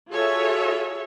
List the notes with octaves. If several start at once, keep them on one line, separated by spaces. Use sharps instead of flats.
F4 F#4 G#4 A4 C#5 E5